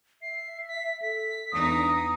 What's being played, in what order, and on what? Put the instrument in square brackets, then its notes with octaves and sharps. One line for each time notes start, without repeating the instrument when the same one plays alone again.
[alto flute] E5 [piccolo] C7
[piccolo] B6
[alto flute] A4 [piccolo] B6
[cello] E2 D#4 [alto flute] D4 [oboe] D#6